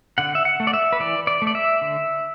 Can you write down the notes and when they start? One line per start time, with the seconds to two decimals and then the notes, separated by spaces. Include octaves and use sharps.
0.18 D3 F#5
0.35 E5
0.45 F#5
0.60 A3
0.67 D5
0.73 E5
0.93 B4
1.00 E3 D5
1.27 D5
1.42 A3
1.47 D5
1.55 E5
1.82 D3